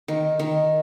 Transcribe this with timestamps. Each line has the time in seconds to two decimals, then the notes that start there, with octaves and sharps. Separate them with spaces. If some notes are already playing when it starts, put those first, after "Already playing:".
0.08 D#3
0.39 D#3